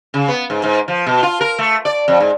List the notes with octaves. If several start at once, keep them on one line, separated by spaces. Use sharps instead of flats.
C#3
B3
G#2
G#2
F3
B2
F4
A#4
A3
D5
F2
G#2